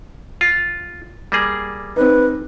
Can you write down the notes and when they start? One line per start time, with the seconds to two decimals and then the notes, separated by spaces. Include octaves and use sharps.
0.41 F4
1.32 G3 A#3 G#4
1.96 C4 D#4 B4